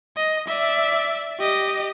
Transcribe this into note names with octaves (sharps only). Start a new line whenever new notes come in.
D#5
D5 E5
G4 D#5